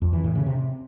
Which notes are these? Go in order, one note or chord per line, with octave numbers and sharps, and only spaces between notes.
F2
E3
A2
C#3
C3